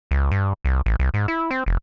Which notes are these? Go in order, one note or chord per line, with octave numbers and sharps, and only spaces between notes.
C#2
G2
C2
A1
C2
G#2
E4
C4
F1